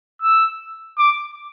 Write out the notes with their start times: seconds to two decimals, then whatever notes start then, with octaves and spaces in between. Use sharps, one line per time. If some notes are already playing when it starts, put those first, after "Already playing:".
0.22 E6
0.98 D6